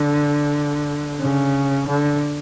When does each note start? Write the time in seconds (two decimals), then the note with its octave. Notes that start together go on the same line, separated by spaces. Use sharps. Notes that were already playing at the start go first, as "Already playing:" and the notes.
Already playing: D3
1.20 C#3
1.88 D3